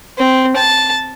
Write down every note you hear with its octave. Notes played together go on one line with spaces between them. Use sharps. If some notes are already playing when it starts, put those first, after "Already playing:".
C4
A5